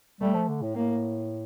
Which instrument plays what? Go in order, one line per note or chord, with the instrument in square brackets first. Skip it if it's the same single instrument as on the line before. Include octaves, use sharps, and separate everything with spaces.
[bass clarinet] G3 [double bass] A3
[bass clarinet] F3
D3
A2
[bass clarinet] A2 [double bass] A#3